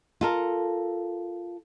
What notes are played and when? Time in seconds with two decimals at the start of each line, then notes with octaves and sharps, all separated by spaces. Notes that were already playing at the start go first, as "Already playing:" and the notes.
0.21 F4 A4 A#4